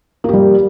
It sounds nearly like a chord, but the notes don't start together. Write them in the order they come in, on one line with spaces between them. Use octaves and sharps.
A#3 G4 G3